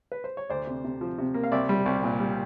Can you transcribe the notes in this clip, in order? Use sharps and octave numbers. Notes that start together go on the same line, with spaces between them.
B4
C5
C#5
D2 C5 D5
C3
C3
F3
C3
A#3
F5
C2 D5 E5
G3
C2
A#2
G3